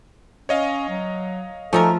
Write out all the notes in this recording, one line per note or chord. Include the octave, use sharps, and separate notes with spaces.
C#4 C#5 D#5 F5
F#3
F3 A3 C#4 D#4 A4 A#4